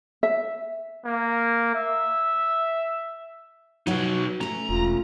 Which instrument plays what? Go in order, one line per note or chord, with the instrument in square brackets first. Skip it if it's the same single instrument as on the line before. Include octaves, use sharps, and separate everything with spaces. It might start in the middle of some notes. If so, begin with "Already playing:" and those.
[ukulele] E5
[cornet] A#3
E5
[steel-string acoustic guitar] F#3 B3 F#4 [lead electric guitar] D#4 B4
[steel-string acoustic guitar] A3 C#4 [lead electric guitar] A#5
[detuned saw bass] E1 [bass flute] F4